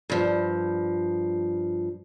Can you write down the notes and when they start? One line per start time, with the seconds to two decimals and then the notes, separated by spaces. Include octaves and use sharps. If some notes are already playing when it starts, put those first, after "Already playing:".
0.10 G2 F3